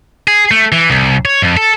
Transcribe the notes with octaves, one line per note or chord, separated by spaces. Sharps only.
G#4
A3
E3
C2
C#5
F2
A4